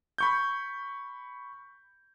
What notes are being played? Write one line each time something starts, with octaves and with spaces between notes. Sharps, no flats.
B5 C#6 G6